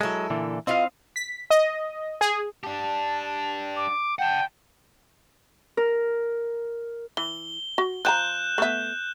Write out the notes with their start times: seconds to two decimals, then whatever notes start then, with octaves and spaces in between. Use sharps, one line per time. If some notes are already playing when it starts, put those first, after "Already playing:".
0.01 F#3 G#3 E4 A4
0.30 A#2 D3 E3
0.67 C4 E4 F4 D#5 F5
1.16 B6
1.50 D#5
2.21 G#4
2.64 D4 G4 A5
3.76 D6
4.19 F#5 G5 A5
5.77 A#4
7.17 E3 G7
7.78 F#4
8.05 F3 G5 A#5 F#6 G6 E7
8.58 A3 B3 E5